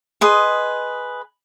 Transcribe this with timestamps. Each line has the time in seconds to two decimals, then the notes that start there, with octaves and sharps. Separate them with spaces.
0.21 G#4 B4 D#5 C6